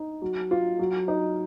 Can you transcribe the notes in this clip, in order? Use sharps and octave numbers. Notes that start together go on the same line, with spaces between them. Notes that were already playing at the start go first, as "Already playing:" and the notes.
Already playing: D#4
F#3
F4
F#3
D#4